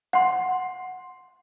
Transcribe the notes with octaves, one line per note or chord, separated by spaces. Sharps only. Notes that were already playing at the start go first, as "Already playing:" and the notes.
F#5 C6